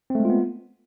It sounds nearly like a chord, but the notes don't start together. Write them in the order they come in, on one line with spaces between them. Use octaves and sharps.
C4 A3 G#3 F4 B3